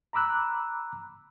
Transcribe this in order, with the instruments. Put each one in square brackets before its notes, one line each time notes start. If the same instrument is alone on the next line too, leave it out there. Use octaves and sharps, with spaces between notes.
[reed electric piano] A#5 B5 D6 E6 F#6